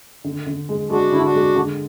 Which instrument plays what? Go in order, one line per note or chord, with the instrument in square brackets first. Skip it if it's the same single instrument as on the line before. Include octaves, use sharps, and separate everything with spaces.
[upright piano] D3
D3
G#3
[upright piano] G#3 [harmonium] D4 F#4
[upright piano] D3 [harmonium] E4
[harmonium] D4 F#4
[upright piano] G#3
D3